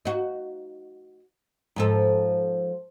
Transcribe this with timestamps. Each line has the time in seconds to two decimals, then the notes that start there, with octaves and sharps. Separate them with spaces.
0.05 D#4 F#4
1.76 G#2 F3 A4